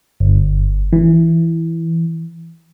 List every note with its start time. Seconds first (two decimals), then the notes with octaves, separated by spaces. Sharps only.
0.20 G1
0.93 E3